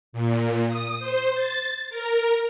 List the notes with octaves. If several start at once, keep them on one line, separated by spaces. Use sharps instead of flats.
A#2
D#6
C5
A6
A#4